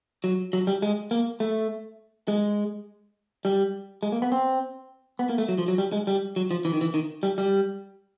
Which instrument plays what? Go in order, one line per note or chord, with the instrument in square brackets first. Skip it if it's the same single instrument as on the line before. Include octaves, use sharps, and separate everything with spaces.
[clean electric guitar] F#3
F#3
G3
G#3
A#3
A3
G#3
G3
G#3
A#3
B3
C4
B3
A#3
A3
F#3
F3
F#3
G3
G#3
G3
F#3
F3
E3
D#3
E3
D#3
G3
G3